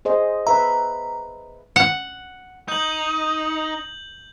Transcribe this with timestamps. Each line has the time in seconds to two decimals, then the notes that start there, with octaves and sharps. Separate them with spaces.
0.05 G#4 C5 D#5
0.47 B4 E5 A#5
1.76 F#5
2.68 D#4 G6 F#7